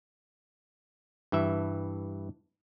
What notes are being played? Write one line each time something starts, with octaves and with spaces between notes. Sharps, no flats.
G2 E3 E5